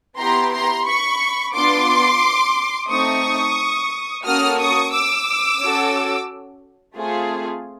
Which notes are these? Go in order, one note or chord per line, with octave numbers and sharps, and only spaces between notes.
B3 E4 G4 A#5 C6
A#5 C6
B5 C#6
B3 D4 F4 C6 D6
A3 C4 D#4 C#6 D#6
A#3 C#4 F#4 A4 D#6 F6
C#6 D#6
D6 E6
C#4 F#4 A4
A3 C4 F4 G#4